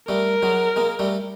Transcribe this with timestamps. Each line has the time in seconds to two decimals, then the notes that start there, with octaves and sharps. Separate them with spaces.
0.08 G3 A3 A#4
0.42 F#3 G#3
0.76 G#3 A#3
0.99 G3 A3